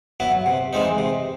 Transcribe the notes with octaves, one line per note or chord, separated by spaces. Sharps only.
F#3 B3 E4
C3
E3 G#3 C4 D#4
C3